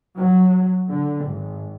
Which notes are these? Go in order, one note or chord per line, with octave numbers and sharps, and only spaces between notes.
F#3
D3
G#1